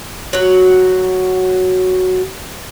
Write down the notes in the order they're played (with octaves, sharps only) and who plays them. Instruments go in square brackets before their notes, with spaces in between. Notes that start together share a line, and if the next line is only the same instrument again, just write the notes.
[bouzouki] F#3 F#4